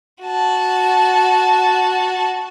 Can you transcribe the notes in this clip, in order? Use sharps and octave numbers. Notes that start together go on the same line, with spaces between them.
F#4 A5